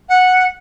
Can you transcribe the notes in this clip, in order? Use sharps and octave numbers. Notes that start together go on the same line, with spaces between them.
F#5